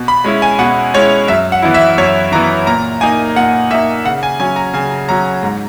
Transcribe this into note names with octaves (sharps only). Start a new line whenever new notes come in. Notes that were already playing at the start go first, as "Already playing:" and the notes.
Already playing: B2
B5
G#3 C#4 E4
G#5
B2 F#5
G#3 C#4 E4 C#5
F#2 E5
F#5
E3 B3 E4
E5
F#2 C#5
E3 B3 E4 A#5
A#2 A#5
A#3 D#4 G#5
A#2 F#5
A#3 D#4 E5
C#3 F#5
G#5
F#3 C#4 G#5
A#5
C#3 G#5
F#3 C#4 A#5
G#2